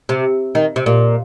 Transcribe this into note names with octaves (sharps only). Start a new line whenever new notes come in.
C3
D#3
C3
A#2